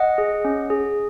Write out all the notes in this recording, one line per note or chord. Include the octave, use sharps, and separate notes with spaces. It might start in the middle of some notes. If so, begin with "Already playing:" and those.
Already playing: D#5 F#5
G#4
C#4
G#4